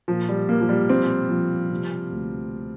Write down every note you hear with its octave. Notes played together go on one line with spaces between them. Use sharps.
A#2 F3
G3
A#1 A#3
F3
G3
A#2 C4
F3
C3
D2